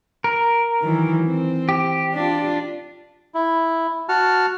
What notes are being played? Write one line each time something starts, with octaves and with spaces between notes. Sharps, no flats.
A#4
D#3 E3 F#3
C4
G4
D4 F4
E4
F#4 A5 F6